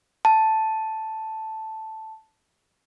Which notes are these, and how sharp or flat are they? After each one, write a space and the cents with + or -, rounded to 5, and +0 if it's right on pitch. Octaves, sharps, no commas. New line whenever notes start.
A5 +0